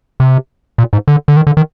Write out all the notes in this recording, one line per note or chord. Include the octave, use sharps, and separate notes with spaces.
C3
A#2
G#2
D3
D3
D#3
D3
D#3